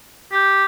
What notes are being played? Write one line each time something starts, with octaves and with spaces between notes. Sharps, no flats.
G4